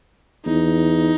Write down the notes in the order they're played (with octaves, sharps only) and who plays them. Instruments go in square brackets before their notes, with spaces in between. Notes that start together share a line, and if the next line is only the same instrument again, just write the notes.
[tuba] E2 [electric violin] D#4